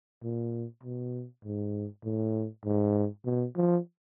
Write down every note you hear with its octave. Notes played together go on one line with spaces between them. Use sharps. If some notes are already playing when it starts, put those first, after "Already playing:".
A#2
B2
G#2
A2
G#2
B2
F3